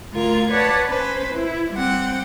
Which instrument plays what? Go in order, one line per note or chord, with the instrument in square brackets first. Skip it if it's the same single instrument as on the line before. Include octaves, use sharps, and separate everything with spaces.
[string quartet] D2 F4 A#4 G#6
B4 C#5 D5 F#5 A5
C#4 B4 C5
E4
G3 C4 F#5 G5